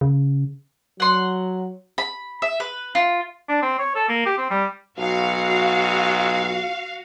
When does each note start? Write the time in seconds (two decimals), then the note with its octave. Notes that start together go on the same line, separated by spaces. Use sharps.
0.01 C#3
1.00 F#3 F#5 C6
1.98 B5
2.42 E5
2.60 B4
2.95 F4
3.49 D4
3.62 C4
3.79 C#5
3.95 A4
4.09 A#3
4.26 G4
4.38 C4
4.50 G3
4.98 B1 F#4 F5